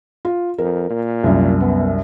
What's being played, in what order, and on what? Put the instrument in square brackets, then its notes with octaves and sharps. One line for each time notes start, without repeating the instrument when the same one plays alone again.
[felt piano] F4
[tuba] F2 [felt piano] A#4
[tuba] A#2
[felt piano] C2 F#2
[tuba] B3